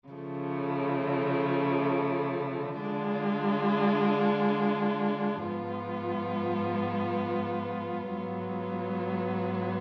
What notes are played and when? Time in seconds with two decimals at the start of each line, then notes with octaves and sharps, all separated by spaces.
0.10 C#3 F3 A3
2.79 D3 G#3 D4 F4
5.46 G#2 F3 B3 F4
8.14 G#2 F#3 B3 F4